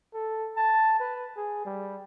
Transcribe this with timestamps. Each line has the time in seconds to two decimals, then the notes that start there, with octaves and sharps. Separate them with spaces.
0.14 A4
0.56 A5
0.99 B4
1.37 G#4
1.65 G3